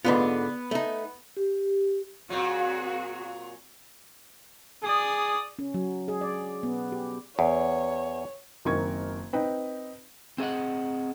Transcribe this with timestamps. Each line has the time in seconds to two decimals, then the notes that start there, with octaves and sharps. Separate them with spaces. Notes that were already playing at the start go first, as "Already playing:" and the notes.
0.05 G#2 D3 B3 F4 B4
0.71 A3 D#4
1.37 G4
2.30 A#2 F#3 C4 F#4 G#4
4.83 G#4 D5 D#6
5.59 C#4
5.74 F#3
6.08 G#4
6.21 D5
6.63 B3
6.92 G4
7.39 E2 C#5
8.65 F#1 D#3 C4 A#4 C#6 G#6
9.33 C4 D#4 B4 G5
10.38 C4 G#4 D#5 F#5